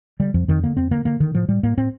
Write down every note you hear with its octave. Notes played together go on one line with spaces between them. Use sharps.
D3 G3
F2 F3
F2 D#3
D3 A#3
F2 C4
D3 A#3
D3 A#3
D3 D#3
A2 F3
A2 G3
A2 A#3
A2 C4